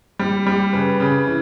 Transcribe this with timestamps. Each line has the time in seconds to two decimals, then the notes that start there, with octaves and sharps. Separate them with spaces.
0.19 G3
0.47 G3
0.73 C#3 B4
1.00 C#3
1.27 E3